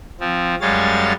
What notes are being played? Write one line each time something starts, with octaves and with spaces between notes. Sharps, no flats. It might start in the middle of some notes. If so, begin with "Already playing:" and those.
F3 C4
F#2 G3 G#3 C#5 F5 A6